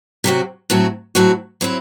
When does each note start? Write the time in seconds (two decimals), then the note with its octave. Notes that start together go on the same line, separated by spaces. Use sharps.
0.24 C3 F#3 C4 F#4
0.70 A2 F#3 C4 F#4
1.15 A2 F#3 C4 F#4
1.61 F#3 C4 E4